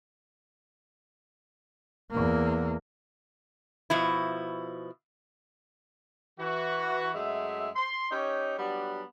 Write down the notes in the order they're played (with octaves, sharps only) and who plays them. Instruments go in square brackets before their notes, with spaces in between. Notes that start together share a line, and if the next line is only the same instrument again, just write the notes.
[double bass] E2 A#3
[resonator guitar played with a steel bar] B2 F3 E4
[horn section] E3 F#4
F#2 G#3 A3 E5
C6
C#4 D#4 G4 C#5
F#3 G3 B3 D4